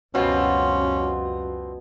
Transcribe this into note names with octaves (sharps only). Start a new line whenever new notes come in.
C#2 F#2 B2 G3 C4 C#4 F4